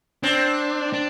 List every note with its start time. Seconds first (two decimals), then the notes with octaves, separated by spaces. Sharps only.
0.23 C4 D4
0.93 D4